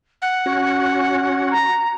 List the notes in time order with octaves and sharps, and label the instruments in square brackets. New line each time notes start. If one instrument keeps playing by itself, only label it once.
[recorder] F#5
[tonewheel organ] C#4 F#4
[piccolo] A#5